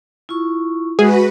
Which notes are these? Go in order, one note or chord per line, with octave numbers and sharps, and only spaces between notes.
E4 F4 C#6
G#3 F#4 G#4 B4 F#5